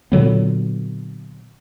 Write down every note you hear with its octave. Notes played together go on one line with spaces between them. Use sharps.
A#2 D3 F#3 B3